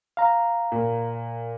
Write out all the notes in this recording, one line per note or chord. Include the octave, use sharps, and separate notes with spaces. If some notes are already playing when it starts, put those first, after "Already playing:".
F5 A#5
A#2